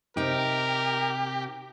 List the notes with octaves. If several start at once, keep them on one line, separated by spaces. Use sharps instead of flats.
C3 D#4 G4 A#4